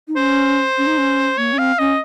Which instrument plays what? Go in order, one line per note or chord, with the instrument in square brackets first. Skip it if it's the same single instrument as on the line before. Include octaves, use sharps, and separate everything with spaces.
[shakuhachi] D#4
[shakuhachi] C#4 [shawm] C5
[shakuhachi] C#4
D#4
C#4
[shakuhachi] A#3 [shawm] C#5
[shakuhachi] C#4
[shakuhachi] C4 [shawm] F5
[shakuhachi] C#4 [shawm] D#5